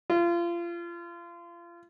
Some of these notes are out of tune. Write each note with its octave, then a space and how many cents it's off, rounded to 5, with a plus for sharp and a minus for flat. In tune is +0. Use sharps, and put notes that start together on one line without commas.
F4 -30